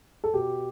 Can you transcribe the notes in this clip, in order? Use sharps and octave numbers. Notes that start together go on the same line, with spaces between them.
A4
B2 G4